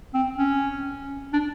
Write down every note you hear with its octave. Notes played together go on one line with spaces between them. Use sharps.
C4
C#4
D4